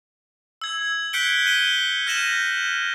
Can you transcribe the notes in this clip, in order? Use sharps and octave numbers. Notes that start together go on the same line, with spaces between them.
E6 G#6
F#6 G6 B6 C#7 D7 G7
F#6 B6 D#7 G7
F6 G6 A#6 D#7 E7 F#7